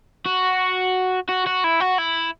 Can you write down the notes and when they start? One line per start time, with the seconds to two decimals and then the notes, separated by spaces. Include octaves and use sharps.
0.26 F#4
1.29 F#4
1.46 F#4
1.64 E4
1.80 F#4
1.98 E4